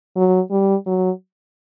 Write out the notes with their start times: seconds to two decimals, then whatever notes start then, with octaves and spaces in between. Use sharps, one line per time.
0.16 F#3
0.51 G3
0.86 F#3